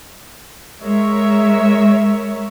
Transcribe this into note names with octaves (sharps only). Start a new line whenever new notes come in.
G#3 A#4 C#5 E5